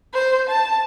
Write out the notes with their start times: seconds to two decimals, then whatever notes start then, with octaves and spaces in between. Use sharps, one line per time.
0.14 C5
0.48 A5